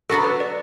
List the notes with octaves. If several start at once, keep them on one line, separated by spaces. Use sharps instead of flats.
F#3 B3 D4 F#4 A4
B4
D5